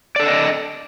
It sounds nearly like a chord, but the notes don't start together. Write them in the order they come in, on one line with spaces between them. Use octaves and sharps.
D5 A4 D4 D#5